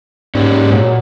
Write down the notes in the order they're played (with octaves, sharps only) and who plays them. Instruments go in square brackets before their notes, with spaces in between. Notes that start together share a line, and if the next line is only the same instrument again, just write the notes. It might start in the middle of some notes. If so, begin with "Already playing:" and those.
[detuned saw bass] G#2 [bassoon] G3 [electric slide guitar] A#3 C#4
[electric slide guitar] A#2 [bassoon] F#3